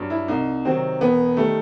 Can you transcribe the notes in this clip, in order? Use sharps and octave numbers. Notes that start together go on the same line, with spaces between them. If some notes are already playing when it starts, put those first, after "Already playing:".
Already playing: G2 F#3
E4
C2 D#4
C3 D#3 F#3 C4
E1 B3
D#3 G3 A3